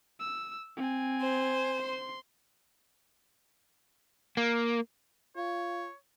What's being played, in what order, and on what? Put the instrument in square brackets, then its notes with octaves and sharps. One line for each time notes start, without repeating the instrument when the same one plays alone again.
[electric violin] E6
C4 G#5
[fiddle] C5
[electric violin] C6
[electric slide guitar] A#3
[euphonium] F4 [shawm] C#5